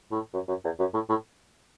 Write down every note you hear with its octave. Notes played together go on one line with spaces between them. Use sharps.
A2
F#2
F#2
E2
F#2
A2
A2